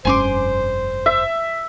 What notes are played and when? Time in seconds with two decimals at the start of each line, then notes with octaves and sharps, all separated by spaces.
0.05 F1 G2 C#4 C5 G#5 C6 D6
1.06 E5